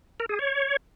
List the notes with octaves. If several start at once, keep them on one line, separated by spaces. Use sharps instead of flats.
A#4
G#4
C#5